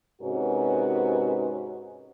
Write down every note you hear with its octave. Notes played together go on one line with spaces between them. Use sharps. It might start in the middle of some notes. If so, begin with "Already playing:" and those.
G#2 C3 C#4 F#4 A#4 B4